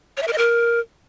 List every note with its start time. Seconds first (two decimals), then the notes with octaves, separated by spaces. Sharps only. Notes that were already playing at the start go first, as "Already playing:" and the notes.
0.17 C#5
0.22 E5
0.28 A#4
0.33 D#5
0.38 A#4